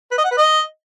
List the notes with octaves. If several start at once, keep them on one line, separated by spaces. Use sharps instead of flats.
B4
D#5
F#5
B4
D#5